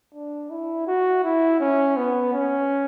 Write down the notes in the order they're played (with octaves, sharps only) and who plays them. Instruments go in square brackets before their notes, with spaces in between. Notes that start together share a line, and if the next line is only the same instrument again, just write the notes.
[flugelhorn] D4
E4
F#4
E4
C#4
B3
C#4